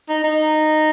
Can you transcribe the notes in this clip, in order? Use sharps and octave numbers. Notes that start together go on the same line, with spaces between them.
D#4
D#4